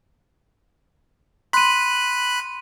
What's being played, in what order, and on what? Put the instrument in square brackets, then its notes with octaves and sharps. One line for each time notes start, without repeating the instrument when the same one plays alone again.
[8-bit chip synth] B5 F#6 [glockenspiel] C6 D#7